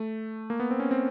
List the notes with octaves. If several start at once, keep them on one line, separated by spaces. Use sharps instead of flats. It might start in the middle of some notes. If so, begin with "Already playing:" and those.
Already playing: A3
A#3
B3
C4
C#4
C4